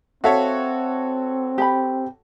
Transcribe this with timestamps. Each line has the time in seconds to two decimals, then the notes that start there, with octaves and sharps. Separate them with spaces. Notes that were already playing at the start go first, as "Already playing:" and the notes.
0.24 C4 F#4 A4 C#5 E5 F5
1.58 G4 A#5 B5